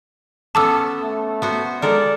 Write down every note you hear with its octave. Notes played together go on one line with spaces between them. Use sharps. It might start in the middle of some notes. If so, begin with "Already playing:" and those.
B3 C#4 A4 A5 D6 E6
A3
B3 F#4 C5
G#3 A4 A#4 D5